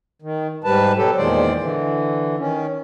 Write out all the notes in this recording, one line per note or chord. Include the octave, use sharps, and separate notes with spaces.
D#3
G#2 G3 B4 A5
B2 F#3 G4 A4
E2 A#2 D#3 G#3 C5 D5
D3 E3
D#3 C#4